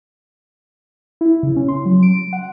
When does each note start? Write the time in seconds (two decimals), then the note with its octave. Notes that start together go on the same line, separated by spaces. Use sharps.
1.21 E4
1.43 C#3
1.56 C#4
1.68 C6
1.86 F#3
2.03 D7
2.33 F#5